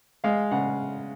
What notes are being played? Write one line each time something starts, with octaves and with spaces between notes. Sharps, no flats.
G#3 F5
C#3 F#5